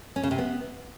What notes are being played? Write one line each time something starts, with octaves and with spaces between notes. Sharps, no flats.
C#4
C#3
C3
B3